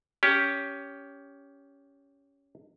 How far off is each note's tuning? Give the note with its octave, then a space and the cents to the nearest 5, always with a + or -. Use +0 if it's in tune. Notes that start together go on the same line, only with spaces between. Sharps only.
C#4 +15 G4 +0